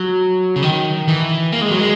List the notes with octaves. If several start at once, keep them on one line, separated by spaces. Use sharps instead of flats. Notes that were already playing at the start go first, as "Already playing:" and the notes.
Already playing: F#3
C#3
D#3
E3
A#3
G#3
F#3
G#3